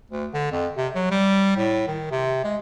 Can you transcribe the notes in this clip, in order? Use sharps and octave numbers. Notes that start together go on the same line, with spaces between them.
D2
D3
F2
C3
F#3
G3
A2
D#3
C3
G#3